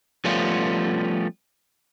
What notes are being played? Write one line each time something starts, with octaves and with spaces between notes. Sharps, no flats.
F3 G3 A3 B3 C#4 F4